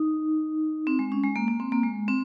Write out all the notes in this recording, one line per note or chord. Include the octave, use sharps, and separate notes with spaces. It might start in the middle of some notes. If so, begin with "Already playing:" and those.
Already playing: D#4
C4
G#3
C#4
G#3
A#3
A#3
C4
A#3
G#3
C4